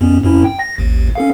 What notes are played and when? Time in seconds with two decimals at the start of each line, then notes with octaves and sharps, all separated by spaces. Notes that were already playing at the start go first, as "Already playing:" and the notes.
0.01 F2 B3 C#4
0.23 F2 C#4 E4
0.44 G5
0.59 A#6
0.78 A1 D#2
1.15 C#4 A4 F5